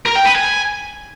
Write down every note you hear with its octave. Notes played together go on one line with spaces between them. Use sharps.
A#4
G5
B4
G#5